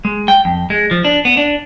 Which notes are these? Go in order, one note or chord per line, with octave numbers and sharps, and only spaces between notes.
G#3
G5
F2
G#3
F3
D4
B3
D4